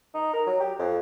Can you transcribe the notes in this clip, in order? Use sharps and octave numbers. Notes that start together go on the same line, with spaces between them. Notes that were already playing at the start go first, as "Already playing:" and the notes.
D#4
A#4
F#3
G4
F2